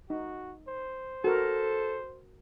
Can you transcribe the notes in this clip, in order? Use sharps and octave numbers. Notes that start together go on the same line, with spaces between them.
D#4 F#4
C5
F#4 A4 A#4